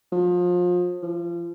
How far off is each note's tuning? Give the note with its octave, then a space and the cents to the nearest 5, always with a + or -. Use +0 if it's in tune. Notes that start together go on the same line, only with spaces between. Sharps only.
F3 +30
F3 -30